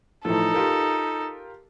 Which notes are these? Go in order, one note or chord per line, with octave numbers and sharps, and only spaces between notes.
A2 E3 F3 D#4 A4
F4 G4 A#4